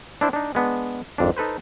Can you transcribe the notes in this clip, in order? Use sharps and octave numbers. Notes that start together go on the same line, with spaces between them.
D4 E4 C5 D5
D4 D#4
G#3 B3 D4
G#1 F2 D4
D#4 A4 B4 C5